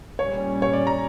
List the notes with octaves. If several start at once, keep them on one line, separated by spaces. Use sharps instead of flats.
A#2 G3 C#4 C#5
C#5
D5
A#5